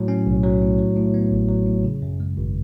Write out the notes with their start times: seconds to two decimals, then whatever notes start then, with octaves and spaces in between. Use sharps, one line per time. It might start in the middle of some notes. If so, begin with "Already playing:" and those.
Already playing: A2 F#3
0.08 C#4
0.26 B1
0.43 F#3
0.62 A2
0.79 F#3
0.96 A2
1.14 B3
1.31 A1
1.49 F#3
1.67 A2
1.84 C#3
2.02 F#2
2.20 G#3
2.37 G#1